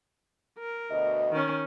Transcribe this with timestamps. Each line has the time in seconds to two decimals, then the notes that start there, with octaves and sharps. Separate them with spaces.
0.58 A#4
0.90 D2 B2 D#5
1.32 D#3 C#4